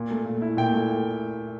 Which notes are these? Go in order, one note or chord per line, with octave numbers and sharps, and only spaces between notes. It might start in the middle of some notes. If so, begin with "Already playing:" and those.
Already playing: A#2
A3
A#2
E4
A#2 G5
A3